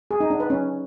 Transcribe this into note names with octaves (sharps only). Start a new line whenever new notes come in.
G#4
D#4
D4
B4
C#4